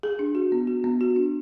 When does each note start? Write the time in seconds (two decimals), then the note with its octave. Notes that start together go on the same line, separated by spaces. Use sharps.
0.03 G#4
0.19 D4
0.35 F#4
0.52 B3
0.67 F#4
0.84 B3
1.01 F#4
1.16 D4